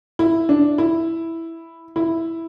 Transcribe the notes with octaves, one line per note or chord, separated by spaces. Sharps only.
E4
D4
E4
E4